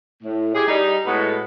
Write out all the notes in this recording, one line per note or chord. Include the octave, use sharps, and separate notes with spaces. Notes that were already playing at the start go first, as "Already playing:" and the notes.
A2
E4 G4 G#4
G3 D#4
A2 G#3 B3 F#4 A4